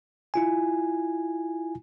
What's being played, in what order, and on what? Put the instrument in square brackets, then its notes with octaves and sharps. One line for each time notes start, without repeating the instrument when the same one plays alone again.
[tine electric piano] E4 F4 G#5